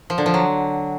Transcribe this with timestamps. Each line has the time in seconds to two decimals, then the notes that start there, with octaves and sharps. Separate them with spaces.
0.10 F3
0.18 D3
0.26 F3
0.34 F#3